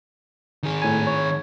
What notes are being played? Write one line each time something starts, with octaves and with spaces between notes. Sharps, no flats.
D#3 G#4
A2 G#5
C#5